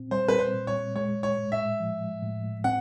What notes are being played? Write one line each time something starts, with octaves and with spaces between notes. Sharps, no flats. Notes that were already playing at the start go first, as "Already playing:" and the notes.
Already playing: A#2 C4
G3 C5
B4
C5
A#2
C#5
G#3 C#5
C#5
A2
E5
F3
A2
C4 F#5